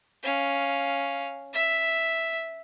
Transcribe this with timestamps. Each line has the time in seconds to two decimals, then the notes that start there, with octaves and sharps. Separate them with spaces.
0.23 C#4 F5
1.53 E5